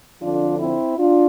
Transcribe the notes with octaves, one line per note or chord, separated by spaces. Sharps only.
F2 D3 F3 D4 F4
C4 E4
D4 F4